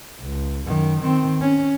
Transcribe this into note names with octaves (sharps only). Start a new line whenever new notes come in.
C#2
F#2 D#3
D#3 C4
C#4